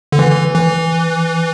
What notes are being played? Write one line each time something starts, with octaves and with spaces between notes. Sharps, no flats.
D3
E3
E3